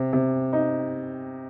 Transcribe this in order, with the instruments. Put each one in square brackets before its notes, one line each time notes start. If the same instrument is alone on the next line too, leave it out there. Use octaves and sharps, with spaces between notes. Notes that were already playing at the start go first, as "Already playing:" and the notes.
Already playing: [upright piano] C3
C3
D#4